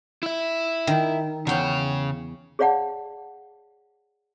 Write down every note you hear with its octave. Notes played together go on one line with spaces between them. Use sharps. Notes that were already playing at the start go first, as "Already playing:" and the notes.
E4 E5
D#3
E2 C#3 C#5 G5
G#4 C#5 D5 F5 F#5 A5